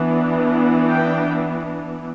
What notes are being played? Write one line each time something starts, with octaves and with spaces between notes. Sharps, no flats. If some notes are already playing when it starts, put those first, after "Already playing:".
Already playing: E3 B3 D4
G5